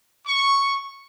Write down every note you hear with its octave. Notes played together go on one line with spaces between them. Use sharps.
C#6